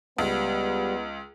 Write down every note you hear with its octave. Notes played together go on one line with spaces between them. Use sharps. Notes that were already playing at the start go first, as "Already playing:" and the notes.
C#2 G3 B3